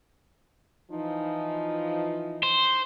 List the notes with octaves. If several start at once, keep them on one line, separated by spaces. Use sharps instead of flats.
E3 F3 D#4
C5